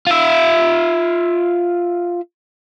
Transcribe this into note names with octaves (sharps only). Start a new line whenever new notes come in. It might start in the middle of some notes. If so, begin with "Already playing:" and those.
F4 E5